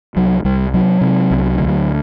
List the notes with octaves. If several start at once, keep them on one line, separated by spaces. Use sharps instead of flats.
C2 F#3
C2 G3
C3 F#3
C3
C2
D2